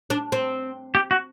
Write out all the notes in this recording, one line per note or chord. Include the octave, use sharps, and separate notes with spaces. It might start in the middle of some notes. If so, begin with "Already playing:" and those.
D4
C4
G4
F#4